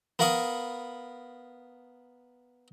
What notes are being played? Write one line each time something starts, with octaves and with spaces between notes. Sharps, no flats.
B3 A#4 F5 B5 C#6 D#6